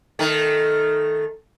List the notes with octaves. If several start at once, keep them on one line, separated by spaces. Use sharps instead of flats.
D#3 A3